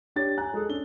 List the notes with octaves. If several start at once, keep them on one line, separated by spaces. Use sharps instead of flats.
D4 G4 C#5 A6
G#5 A#5 F#6
G#3 G#4 A4
C#4 D4 G7